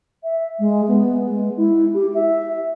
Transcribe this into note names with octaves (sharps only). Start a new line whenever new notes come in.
E5
G#3
B3
G#3
E4
G4
E5